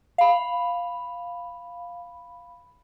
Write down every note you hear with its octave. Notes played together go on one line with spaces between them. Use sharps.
F5 B5